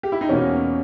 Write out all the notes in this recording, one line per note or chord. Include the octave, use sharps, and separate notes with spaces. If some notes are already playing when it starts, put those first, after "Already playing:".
G4
E4
D#4
E2 B2 A#3 C#4